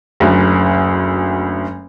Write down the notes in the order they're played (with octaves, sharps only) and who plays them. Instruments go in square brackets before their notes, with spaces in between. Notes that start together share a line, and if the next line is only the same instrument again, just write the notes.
[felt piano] F#1 D2